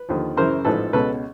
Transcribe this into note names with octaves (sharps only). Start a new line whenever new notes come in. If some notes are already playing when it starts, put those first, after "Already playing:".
Already playing: B4
D#2 D3 F3
F#2 C#3 E3 A#4 C5
A1 G#2 F3 A4 B4
C#2 B2 A4 B4